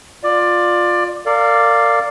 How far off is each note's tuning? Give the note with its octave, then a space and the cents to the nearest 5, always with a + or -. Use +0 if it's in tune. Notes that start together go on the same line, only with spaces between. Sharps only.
F4 +10 D5 +15
A#4 -35 D5 +0 F5 +0